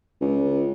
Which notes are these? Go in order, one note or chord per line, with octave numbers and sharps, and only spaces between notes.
C#2